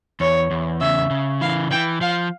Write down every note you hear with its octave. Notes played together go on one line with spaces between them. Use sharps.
E2 C#5
E2
C#3 E5
C#3
E3 F5
E3 G5
F3 F5